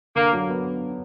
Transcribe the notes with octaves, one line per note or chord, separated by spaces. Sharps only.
D3 A#3
F#3
B3